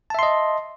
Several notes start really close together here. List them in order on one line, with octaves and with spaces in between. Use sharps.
A5 E5 C6 D#5